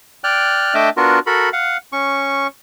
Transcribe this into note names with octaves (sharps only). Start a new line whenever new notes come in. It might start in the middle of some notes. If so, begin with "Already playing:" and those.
D5 G5 F6 F#6
A3 D4 D#5 E5 G5 D6
B3 D4 F4 F#4 A#4
F#4 A4 A#4 B5
F5 F#5
C#4 C#6